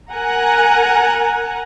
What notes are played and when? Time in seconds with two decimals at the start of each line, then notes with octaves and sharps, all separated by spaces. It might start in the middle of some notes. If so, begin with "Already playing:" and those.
0.12 A#4 F#5 G#5 A#5